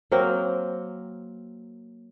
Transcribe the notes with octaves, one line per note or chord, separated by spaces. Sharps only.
F#3 A#3 C4 A#4